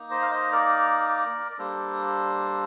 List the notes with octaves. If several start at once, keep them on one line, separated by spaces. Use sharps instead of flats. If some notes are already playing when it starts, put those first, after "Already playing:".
Already playing: A#3 D#4
C5 D#5
F5
C5 D#5
A#4 D5
D5
G3 A#3 D4 A4 C5